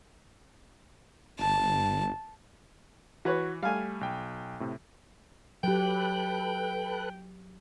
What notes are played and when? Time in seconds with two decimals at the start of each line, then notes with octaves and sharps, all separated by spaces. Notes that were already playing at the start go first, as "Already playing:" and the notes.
1.39 G1 A5
3.25 E3 F#4 B4 C#5
3.63 G3 A3 F5 G#5
4.01 B1 G5
4.60 A2 C3
5.63 F#3 G4 A4 B4 G5 F#6